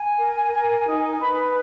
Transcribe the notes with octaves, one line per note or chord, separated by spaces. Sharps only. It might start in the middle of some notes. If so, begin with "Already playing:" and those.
Already playing: G#5
A#4
A#4
D#4
B4 B5